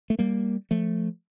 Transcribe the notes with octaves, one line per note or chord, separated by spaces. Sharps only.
A3
G3 A#3
F3 A3